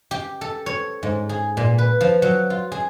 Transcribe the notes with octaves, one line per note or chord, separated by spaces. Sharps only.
G4
A4
C#5
G#2
G#4
A#2
B4
F3
F#3
F4
G#4